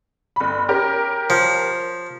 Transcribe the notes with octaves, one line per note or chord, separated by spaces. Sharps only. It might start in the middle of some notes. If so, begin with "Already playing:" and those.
G1 B5
C#4 G4 A#4
F3